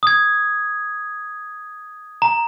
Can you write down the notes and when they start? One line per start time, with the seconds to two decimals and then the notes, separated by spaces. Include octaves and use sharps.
0.03 D#6 G#6
2.22 A#5